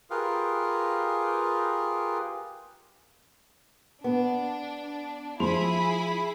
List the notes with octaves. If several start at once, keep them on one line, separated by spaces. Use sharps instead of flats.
F4 G4 G#4 A#4 B4 F5
B3 D4
F3 E4 G#4 B5 C6 F7